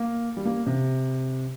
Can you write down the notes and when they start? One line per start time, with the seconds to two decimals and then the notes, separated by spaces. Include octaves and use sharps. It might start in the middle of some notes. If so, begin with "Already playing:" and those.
Already playing: A#3
0.37 G3
0.45 A#3
0.66 C3